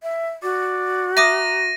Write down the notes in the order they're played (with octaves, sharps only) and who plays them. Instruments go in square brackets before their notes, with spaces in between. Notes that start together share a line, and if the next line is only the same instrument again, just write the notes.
[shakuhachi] E5
[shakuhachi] F#4 [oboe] D5
[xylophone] E5 D6 D#6 [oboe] A#5 [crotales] A#6 D#7